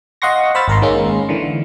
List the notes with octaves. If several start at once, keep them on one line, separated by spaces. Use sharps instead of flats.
D#5 F5 F#5 C6 C#6 A#6
C5 B5 E6 F6 A6
G#1 A#4 A#5 C6
D#3 G#3 A#3 C#4
D3 E3